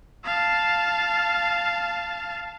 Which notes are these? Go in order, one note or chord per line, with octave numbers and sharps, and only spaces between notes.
F5 A5